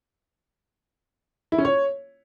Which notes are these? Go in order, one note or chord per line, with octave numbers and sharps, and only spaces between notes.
E4
C#4
C#5